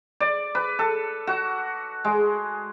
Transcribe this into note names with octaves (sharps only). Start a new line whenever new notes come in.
D5
B4
A4
F#4
G#3